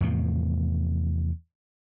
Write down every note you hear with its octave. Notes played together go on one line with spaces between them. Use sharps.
E2 A2 C3 F3